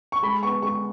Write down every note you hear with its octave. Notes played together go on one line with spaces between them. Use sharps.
C#6
G#3 B5
B3 C#6
G#3 C#6